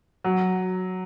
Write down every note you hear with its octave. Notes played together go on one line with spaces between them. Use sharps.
F#3